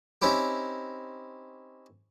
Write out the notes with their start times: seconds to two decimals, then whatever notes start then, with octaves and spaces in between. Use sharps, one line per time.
0.22 C4 C#4 D#4 E4 G4